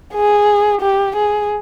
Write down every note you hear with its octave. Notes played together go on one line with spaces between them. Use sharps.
G#4
G4
G#4